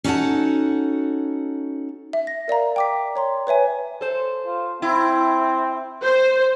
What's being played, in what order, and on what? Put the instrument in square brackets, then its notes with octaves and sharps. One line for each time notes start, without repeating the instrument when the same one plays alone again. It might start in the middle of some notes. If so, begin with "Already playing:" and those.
[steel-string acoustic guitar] C#4 D#4 F#4 A4 F#5 A5
[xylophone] E5
A#6
A#4 D5 F5 A#5
G5 D6 B6
C#5 A#5 C6
B4 C#5 E5 G#5
[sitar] A4 C5
[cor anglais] F4
[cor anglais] C4 [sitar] E4
[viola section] C5